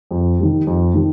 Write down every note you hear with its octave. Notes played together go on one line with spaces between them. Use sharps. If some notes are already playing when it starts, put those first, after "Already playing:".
F2
D#3 G3
F2
D#3 G3